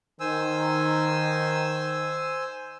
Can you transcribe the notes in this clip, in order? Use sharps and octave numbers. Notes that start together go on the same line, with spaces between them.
D#3 C5 G#5 E6